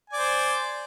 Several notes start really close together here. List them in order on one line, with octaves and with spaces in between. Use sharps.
G#5 D5 C5